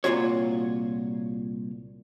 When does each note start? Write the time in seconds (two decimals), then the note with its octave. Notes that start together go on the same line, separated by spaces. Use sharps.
0.04 C2 A#2 E3 F4 F#4 C#5